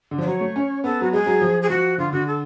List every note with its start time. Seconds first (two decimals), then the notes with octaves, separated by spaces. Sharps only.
0.11 D3
0.18 F3
0.21 D5
0.27 F#3 C#5
0.41 A3
0.56 C#4
0.84 B3 A4
1.01 F#3 F#4
1.13 G#3 G#4
1.26 F#3
1.42 F3
1.62 G#4
1.69 F3 F#4
1.98 D3 F4
2.12 D3 F#4
2.27 A4